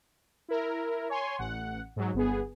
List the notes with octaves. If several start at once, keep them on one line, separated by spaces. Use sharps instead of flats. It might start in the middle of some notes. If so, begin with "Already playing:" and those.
E4 A#4
C#5 G#5 C6
A1 F#5
G#2 F#3
G1 B3 G#4